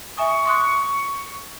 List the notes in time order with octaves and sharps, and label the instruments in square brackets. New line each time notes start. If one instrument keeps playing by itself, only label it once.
[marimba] E5 G#5 D#6 [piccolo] C#6
[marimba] C6 D#6 F#6